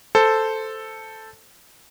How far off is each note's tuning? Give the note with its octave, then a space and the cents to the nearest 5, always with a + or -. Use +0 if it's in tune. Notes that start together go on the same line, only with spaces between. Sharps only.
A4 +0 C5 -5